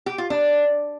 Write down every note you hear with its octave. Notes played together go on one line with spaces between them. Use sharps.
G4
F4
D4